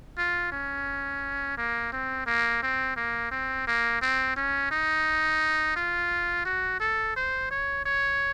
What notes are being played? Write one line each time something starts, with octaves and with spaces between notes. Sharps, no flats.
F4
C#4
A#3
C4
A#3
C4
A#3
C4
A#3
C4
C#4
D#4
F4
F#4
A4
C5
C#5
C#5